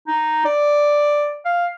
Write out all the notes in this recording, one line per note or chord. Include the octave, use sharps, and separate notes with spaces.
D#4
D5
F5